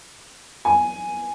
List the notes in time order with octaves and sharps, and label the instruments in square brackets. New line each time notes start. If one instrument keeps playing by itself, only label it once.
[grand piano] G#5